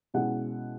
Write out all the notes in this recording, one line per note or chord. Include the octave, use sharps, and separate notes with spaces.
B2 G#3 C#4 E4 F#5